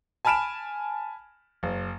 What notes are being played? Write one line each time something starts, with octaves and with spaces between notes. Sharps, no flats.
G#5 A5 B5 F6 D7 E7
F#1